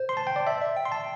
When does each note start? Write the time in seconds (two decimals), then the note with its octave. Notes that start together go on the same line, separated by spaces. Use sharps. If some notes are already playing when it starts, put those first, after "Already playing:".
Already playing: C5
0.09 C6
0.17 A5
0.27 G5
0.36 D5
0.47 D5 E5
0.61 E5
0.77 G5
0.85 C6
0.92 A5